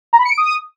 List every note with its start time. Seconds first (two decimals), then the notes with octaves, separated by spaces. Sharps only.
0.13 A#5
0.19 B5
0.25 C#7
0.31 D7
0.38 D#6